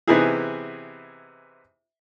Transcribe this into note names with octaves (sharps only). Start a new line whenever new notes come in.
C3 E3 B3 D#4 E4 G#4